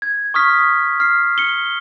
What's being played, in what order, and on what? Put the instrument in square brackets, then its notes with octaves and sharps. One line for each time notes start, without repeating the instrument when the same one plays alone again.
[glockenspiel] G#6
C#6 D#6 F6 B6
F6 C7
C#7 G7